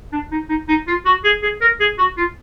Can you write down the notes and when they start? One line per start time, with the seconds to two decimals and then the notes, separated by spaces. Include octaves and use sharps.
0.13 D4
0.32 D#4
0.49 D#4
0.68 D#4
0.87 F4
1.05 F#4
1.24 G#4
1.43 G#4
1.61 A#4
1.80 G#4
1.98 F#4
2.17 F4